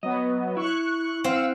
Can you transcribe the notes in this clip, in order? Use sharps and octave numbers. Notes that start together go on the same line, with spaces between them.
F#3 B3 D#5
E4 C#6 F#6
C4 F5 F#5 E6